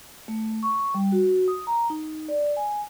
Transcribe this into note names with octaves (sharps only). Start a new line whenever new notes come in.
A3
C#6
G3
F#4
D#6
A#5
D#4
D5
G#5